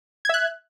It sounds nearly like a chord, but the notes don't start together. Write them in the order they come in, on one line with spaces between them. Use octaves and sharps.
G#6 E5 F#6